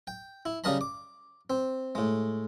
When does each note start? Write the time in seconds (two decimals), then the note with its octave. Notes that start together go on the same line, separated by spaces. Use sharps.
0.07 G5
0.46 E4
0.64 C#3 G3 A#4 D#5 A5 B5
0.81 D6
1.50 C4
1.95 A2 G#3